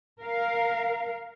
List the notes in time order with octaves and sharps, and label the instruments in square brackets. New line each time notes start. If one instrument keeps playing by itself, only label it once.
[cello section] A#4 F5